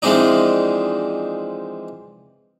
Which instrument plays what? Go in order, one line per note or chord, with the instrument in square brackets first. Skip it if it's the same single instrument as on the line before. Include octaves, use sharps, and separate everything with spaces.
[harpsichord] E3 F3 G#3 C4 D4 D#4